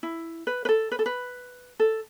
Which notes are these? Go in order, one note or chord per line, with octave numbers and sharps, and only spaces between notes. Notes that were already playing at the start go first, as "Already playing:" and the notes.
E4
B4
B4
A4
B4
A4
B4
A4